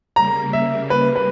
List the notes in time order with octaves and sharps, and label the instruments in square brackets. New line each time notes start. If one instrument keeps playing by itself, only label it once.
[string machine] C#3 G3 A#3 [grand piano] A#5
[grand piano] E5
B4
B4